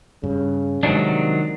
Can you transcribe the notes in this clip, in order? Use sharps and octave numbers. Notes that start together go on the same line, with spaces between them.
G2 C#3
C3 D#3 F3 F#3 G#3 D4